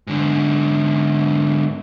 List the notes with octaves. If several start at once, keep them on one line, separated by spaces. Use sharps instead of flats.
G#2 D3